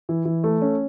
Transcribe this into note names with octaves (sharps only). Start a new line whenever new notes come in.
E3
E3
A3
C#4